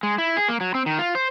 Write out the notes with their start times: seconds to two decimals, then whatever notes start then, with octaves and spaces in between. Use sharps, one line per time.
0.03 G#3
0.18 E4
0.37 G#4
0.49 A#3
0.61 F#3
0.75 C4
0.86 D#3
0.99 F4
1.15 C5